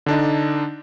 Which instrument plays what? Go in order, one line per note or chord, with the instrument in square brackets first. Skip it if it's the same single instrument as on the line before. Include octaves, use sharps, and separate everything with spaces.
[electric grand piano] D3 D4 D#4